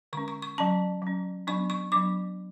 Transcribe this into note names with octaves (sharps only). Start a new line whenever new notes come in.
D3 G#3 C#4 C#6
C#6
C#6
F#3 C#4 A5
F#3 C#4
F#3 B3 D4 C#6
C#6
F#3 B3 D4 D6